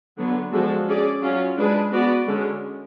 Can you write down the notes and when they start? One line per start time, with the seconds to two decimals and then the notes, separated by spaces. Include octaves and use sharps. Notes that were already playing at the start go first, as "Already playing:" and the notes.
0.18 D3 F#3 B3
0.52 F3 G#3 D4 F#4 A4
0.87 C#4 G#4 D5
1.22 F#3 C#4 F4
1.57 G#3 D4 G#4 B4
1.92 B3 F#4 B4 D5
2.27 D3 G#3 C#4